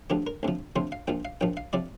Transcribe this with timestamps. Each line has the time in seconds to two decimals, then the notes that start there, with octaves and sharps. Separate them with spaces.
0.10 D2 D3 F3 G4
0.27 A#4
0.43 D2 C3 F3
0.76 D2 C3 F3 C5
0.92 F5
1.08 A#1 A#2 F3 G5
1.25 F5
1.41 A#1 A#2 F3 G5
1.57 F5
1.73 C3 F3 D5